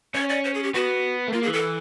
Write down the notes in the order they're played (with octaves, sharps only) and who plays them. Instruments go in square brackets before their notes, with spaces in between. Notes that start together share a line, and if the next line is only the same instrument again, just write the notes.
[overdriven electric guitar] C#4 [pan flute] C#5
[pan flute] D5
C5
G#4
G4
[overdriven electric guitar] B3 [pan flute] F#4
[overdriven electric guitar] A3
[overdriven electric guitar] A#3 [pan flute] F4
[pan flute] G#4
[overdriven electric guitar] E3
[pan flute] A4